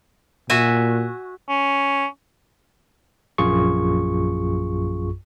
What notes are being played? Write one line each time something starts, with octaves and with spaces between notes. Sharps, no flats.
A#2 F#4 E5 G#5
C#4
A#1 F#2 F4 G#4 C#6